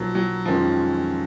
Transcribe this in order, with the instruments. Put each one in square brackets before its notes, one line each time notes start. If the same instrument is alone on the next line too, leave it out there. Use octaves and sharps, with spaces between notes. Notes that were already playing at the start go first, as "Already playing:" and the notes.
Already playing: [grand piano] B1 B2 A#3 D#4 A#4 [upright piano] F3 F#3
[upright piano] F#3
[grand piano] F2 D#3 G#3 C#4 F4 [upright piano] F3